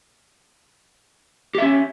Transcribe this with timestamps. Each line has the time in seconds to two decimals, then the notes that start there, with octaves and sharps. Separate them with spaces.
1.55 G4
1.58 E5
1.62 C#4